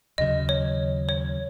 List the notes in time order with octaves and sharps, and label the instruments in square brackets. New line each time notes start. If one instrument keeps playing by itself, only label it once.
[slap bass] D#2 C#3 F#3 [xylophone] D#5
[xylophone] C#5
C#5